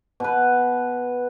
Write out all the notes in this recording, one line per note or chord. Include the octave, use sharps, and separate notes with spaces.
B2 B4